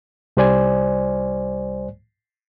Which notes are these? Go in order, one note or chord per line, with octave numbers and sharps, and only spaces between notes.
C2 G3 C5 D5 G#5